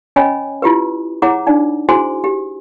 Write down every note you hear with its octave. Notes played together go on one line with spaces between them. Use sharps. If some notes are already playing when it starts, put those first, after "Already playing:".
C#4 C#5 D#5 G#5 B5
E4 F4 G4 B4
E4 G#4 C#5 F#5 A#5 D6
D4 D#4 D5
E4 F#4 G#4 C5 G#5 C6
G4